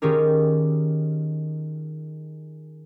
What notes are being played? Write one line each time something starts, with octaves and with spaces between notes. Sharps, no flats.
D#3 C#4 F4 G4 G#4 A#4